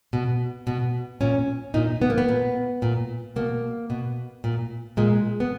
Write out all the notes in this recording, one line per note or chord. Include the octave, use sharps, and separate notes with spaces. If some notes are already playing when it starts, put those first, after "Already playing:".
B2
B2
A#2 C#4
A#2 D#4
B3
A#3
B3
A#2
A#2
B2 A#3
B2
A#2
A#2 G#3
B3